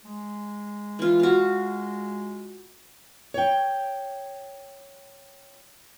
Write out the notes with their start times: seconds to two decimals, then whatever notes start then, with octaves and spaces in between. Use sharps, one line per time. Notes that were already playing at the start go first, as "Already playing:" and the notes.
0.05 G#3
0.99 E3 F4
1.20 F#4 F5
3.34 C#5 G5